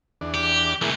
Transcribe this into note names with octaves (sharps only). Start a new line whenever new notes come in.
E2 D4
G4
C2 A2 E3 A#3 G#4